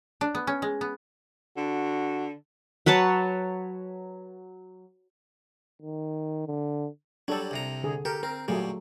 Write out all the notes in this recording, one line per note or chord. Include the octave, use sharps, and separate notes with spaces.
D4
B3
C#4
G#3
B3
D3 F#4
F#3 B4 C#5 A5
D#3
D3
F#3 G3 D4 A4
C2 C3 A#5
D3 G#4
G4 A4 A#4
C4 A#4
A#2 F#3 G3 A3 G#4